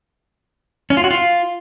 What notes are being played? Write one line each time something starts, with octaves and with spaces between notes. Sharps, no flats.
C#4
F4
F#4
F4